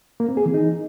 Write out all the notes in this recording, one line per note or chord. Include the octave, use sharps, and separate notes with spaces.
A#3
C4
G#4
E3
D#4